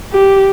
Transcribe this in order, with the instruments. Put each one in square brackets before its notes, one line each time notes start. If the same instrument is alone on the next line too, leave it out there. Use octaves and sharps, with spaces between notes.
[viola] G4